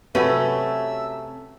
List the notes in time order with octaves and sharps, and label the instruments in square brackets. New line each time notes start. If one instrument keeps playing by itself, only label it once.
[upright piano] C3 F#3 [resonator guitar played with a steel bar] A3 C#4 [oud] F#4 B4 [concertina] E5 E6